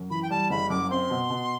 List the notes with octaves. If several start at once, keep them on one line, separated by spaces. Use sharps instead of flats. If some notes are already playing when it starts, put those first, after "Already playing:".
Already playing: F#2
E3 B5
G5
G3 A5
F#1 B5
F#2 D6
C4 C6
B2
B2